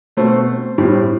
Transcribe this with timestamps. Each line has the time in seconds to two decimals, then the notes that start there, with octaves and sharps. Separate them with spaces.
0.17 B2 A3 C4 C5
0.78 A2 G3 C4